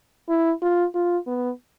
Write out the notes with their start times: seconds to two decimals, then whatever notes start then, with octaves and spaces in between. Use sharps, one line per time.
0.28 E4
0.62 F4
0.95 F4
1.27 B3